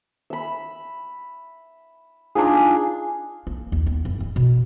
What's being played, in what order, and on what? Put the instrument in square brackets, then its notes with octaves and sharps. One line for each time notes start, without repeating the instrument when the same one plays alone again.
[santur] E5 B5
D4 D#4 F4 G#4
[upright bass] A#3
D#2
B3
F#2
D1
B2